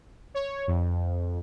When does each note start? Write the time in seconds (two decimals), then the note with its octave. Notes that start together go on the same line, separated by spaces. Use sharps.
0.34 C#5
0.67 F2